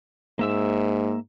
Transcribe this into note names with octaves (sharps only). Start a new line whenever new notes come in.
G#2 A#3 E5 E6